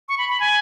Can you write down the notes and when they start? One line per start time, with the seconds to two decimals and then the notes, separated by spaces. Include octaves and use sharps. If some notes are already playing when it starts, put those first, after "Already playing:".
0.08 C#6
0.18 B5
0.29 B5
0.40 G#5